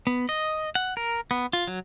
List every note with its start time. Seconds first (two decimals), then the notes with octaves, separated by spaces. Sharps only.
0.07 B3
0.29 D#5
0.75 F#5
0.97 A#4
1.31 B3
1.53 F4
1.67 F#3